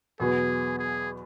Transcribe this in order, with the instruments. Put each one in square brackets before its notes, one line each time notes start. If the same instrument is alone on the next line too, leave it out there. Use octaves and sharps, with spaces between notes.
[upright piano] E2 B2 F#3 B3 [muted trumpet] G#4
[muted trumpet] G#4